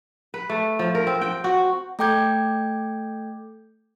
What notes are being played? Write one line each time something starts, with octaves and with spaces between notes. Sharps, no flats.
B4
A3
F3
A#4
C4
G5
F#4
A3 A4 G5 D6 G6 G#6